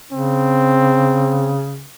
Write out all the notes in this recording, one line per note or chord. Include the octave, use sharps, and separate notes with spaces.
C#3 C4